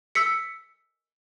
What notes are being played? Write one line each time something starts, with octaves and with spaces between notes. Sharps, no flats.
E6 B6 C#7